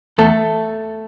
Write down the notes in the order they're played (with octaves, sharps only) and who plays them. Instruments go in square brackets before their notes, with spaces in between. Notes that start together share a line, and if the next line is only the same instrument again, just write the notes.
[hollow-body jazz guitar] E2 A3 A4